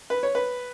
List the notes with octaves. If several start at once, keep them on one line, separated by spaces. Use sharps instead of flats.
B4
C#5
B4